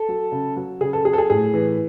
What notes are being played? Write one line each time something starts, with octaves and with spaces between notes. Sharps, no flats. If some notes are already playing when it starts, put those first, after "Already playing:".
Already playing: A4
F#3
C#3
F#3
C#3 G#4
A4
F#3 G#4
A4
G#4
A2 G#4
E3